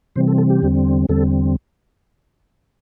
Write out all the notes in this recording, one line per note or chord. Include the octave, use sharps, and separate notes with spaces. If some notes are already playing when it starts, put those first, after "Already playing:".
C3 E3 G3 C4 C5
A4
A4
G4
E2 D3 G3 C4
E2 D3 G3 C4 A4